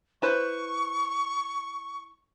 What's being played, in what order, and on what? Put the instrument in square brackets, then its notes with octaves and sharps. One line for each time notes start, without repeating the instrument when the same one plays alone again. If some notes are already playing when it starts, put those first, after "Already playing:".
[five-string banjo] E4 B4 C5 [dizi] C#6